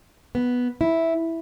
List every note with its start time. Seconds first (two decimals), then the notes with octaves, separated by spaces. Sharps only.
0.35 B3
0.81 E4